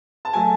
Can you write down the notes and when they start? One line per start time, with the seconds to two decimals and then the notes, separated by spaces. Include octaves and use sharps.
0.25 A5
0.33 F#3 A3 G#5